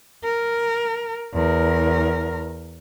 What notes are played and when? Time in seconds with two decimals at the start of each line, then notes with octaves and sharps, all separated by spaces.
0.24 A#4
1.34 E2 A#4